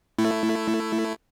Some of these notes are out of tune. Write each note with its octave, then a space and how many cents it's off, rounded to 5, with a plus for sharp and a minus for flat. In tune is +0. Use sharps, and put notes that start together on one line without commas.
A3 +10 E4 +10